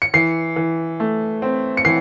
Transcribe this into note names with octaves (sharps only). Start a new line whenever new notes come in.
C#7
E3 C7
E3
A3
C4
C#7
E3 C7